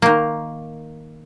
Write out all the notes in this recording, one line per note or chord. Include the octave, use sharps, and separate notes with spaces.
D#3 A#3